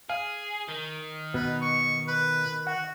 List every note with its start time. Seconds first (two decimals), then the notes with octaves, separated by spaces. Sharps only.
0.10 G#4 F5
0.68 D#3
1.34 B2 B4
1.62 C#6
2.08 B4
2.67 F#4 F#5